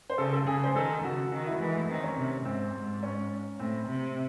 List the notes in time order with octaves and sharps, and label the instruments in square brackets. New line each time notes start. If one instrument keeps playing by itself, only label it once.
[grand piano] C5
[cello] C#3 [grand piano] A4
[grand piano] A4
[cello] C#3 [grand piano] G#4
[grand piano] C5
[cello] D#3 [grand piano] A4
[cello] C#3 [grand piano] F#4
[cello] D#3 [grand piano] F#4
[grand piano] E4
[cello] E3 [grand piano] G#3
[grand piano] A3
[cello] D#3 [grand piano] C4
[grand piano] C#4
[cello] C3
[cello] G#2 [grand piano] C4
[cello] G#2
[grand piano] C#4
[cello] A2 [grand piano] C4
[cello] C3